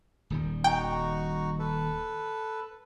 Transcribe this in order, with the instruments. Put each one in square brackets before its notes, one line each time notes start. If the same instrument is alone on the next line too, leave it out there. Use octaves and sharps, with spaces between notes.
[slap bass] D#1 D#3 G3
[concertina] D#4 F#4 C#6 [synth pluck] G5
[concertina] A4 B4